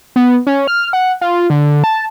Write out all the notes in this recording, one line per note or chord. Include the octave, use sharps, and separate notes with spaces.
B3
C#4
F6
F#5
F4
D3
A5